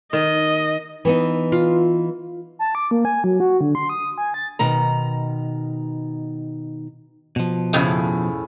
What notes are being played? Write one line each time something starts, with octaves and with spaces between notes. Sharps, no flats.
D#3 D#5
E3 B3 D#4
F4
A5
D6
A#3
G#5
F#3
F#4
D3
C6
D#6
G#5
A6
B2 D#3 A#5
B2 F3
F2 A2 C#3